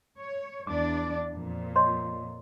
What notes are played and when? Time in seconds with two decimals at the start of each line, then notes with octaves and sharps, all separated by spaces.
0.19 C#5
0.67 E2 D4 D5 D6
1.34 F2 A#2
1.76 C#5 D#5 C6